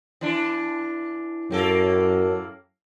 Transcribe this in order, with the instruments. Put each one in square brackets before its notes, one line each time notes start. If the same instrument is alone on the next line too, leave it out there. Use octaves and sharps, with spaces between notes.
[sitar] E3 D4
[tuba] F#2 [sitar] A2 A#3 A4